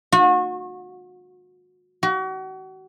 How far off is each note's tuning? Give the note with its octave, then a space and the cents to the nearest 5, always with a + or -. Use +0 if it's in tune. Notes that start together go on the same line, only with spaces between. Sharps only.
F#4 -35
F#4 +35